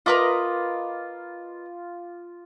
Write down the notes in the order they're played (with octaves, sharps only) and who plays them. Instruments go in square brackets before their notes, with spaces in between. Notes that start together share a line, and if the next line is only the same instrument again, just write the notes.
[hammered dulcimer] F4 D6 [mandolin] A#4 B4 D#5